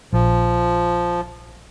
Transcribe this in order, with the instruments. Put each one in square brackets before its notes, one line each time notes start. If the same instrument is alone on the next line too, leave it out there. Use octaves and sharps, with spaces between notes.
[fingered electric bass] A#1 [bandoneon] F3